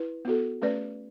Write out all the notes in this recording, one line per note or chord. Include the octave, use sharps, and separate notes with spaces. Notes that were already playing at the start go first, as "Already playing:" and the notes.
Already playing: E4 B4
B3 F#4 A4
A3 C#4 G#4 B4 D5